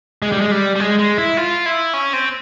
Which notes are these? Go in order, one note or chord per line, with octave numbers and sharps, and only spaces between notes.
G#3
G3
G#3
G3
G3
G#3
G#3
E4
F4
E4
C#4
C4